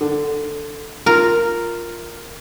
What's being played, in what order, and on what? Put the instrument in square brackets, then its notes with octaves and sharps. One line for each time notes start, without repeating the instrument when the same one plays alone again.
[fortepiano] D3
[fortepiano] F4 [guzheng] A#4